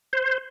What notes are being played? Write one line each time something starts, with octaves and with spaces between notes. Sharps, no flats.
C5